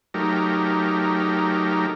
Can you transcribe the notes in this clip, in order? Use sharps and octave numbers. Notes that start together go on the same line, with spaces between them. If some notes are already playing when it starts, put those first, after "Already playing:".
F#3 A3 D#4 G4 A#4